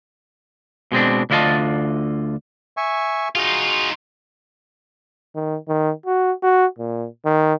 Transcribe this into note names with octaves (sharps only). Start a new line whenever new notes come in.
B2 G#3 C4 D4
D2 D3 E4 F4 D#5 A5
E5 G#5 C#6
D#4 F4 F#4 G#4
D#3
D#3
F#4
F#4
A#2
D#3